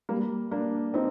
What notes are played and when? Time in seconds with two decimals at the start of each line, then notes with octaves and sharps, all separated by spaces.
0.09 G3 A#3
0.51 A#3 D4
0.94 C4 D#4